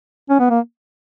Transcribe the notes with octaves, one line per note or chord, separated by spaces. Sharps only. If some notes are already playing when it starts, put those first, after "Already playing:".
C#4
B3
A#3